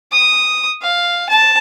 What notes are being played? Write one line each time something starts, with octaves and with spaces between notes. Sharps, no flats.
D#6
F5
A5